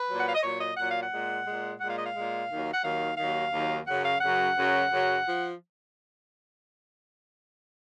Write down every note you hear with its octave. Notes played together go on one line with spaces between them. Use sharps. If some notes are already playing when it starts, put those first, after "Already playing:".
Already playing: B4
A#2 F#3
F#5
F5
D#5
A#2 F#3 C#5
D#5
A#2 F#3 F#5
F5
F#5
A#2 G#3
A#2 G#3
A#2 G#3 F#5
F5
D#5
F5
A#2 G#3
D#2 D#3 F#3
F#5
D#2 D#3 F#3 F5
D#2 D#3 F#3 F5
D#2 D#3 F#3
F#2 C#3 F#3 F#5
F5
F#2 C#3 F#3 F#5
F#2 C#3 F#3
F#2 C#3 F#3
F3